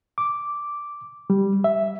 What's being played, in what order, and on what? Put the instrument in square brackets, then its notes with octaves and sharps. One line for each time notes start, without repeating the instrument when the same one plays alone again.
[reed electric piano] D6
G3
E5